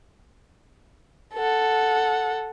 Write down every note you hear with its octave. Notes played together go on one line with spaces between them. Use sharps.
A4 F#5